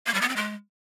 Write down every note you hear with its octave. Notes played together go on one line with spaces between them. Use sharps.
A#3
G3
B3
C4
G#3